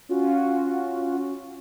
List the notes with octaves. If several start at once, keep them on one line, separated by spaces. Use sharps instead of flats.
C#4 F4 F#4